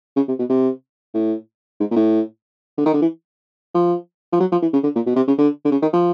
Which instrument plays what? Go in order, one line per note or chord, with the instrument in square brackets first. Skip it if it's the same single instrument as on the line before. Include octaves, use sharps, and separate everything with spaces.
[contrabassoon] C#3
C3
B2
C3
A2
G#2
A#2
A2
D3
D#3
D3
E3
F3
F3
F#3
F3
E3
C#3
D3
A#2
B2
C3
C#3
D3
D3
C#3
D#3
F3